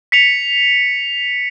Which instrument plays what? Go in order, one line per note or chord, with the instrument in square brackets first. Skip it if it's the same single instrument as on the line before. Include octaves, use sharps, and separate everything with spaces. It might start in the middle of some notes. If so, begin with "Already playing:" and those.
[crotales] B6 C#7 F7